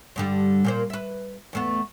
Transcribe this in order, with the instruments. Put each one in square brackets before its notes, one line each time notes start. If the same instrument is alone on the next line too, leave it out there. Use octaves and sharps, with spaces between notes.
[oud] G2 D3 G3
A#2 A#3 C5
B4 E5
E2 A3 B3